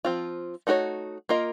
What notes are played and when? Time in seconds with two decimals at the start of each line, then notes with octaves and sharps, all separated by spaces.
0.05 F3 C4 F4
0.67 A3 D#4 F#4 A#4 C#5
1.29 A#3 F4 A#4 D#5